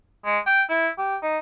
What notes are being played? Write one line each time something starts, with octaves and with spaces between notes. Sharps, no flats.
G#3
G5
E4
G4
D#4